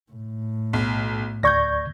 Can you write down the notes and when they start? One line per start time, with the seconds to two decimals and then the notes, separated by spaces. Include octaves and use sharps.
0.12 A2
0.73 B1
1.43 D2 D5 C#6 G6 G#6 A#6